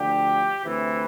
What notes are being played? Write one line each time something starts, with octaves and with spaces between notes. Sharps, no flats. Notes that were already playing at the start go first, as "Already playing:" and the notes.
Already playing: D2 D3 F3 G4
D2 C3 E3